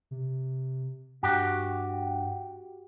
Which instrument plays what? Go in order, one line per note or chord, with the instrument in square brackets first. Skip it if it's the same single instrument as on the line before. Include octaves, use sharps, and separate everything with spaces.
[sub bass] C3
[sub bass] G2 [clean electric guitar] F#4 G4